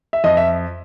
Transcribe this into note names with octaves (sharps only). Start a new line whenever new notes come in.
E5
F2 D#5
E5